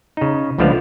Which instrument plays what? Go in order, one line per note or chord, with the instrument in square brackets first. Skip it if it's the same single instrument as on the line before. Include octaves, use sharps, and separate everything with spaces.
[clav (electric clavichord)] C#3 D#4
C#2 D3 F3 A3 B3 F5